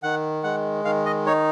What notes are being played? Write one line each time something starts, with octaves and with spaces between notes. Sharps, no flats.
D#3 F#5
G#3 F#5
D#3 F5
D#5
D#4 C#5